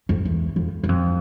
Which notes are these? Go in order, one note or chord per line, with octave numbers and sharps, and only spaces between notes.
F2
E2
F2
F#2
F2